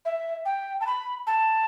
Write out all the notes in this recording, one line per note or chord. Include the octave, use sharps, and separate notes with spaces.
E5
G5
A5
B5
A5